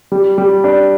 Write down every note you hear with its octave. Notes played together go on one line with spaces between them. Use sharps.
G3
G3
D4